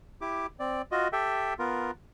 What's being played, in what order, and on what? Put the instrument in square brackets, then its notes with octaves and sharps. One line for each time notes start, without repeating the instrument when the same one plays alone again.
[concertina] E4 G4 D6
C4 D5
F4 F#4 D#5
G4 A4 E5 G5
B3 F4 A#4